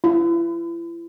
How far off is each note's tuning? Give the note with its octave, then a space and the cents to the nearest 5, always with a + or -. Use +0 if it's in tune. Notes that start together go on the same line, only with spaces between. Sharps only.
E4 +35